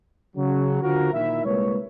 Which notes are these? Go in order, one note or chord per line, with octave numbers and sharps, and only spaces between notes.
C#3 F#3
D3 F3 F#4 A#4
A#1 D#3 E4 E5
C2 G#3 A#3 B4 C#5